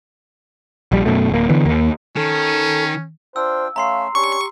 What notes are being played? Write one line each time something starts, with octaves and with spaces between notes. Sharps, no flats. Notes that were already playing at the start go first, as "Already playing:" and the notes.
A#1 G3
F#2 B2 A3
D1 A#3
D3 E3 B3
D#2 A#3
D#3 C#4 A4
D4 F4 C5 G5 E6
A3 C#4 E5 F5 A#5 C6 C7
C#4 D4 G4 C#5 C#6